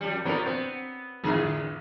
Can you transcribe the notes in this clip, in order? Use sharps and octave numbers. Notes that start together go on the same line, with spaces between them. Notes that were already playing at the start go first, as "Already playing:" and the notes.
F2 G3
F3 F#3 B3 D4 A#4
B3 C4
A1 F2 D3 G#4